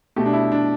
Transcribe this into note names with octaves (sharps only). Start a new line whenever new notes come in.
B2 A3 G4
D4
E4
D4